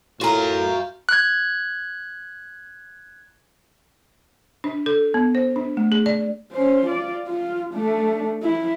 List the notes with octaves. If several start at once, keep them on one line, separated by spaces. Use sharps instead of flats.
A2 F4 F#4 A#4 G#5
F#6 G#6
D4
A4
B3
C5
D4
A3
G#4
D5
C#4 C5
F4 D5
F4
A3 D4
E4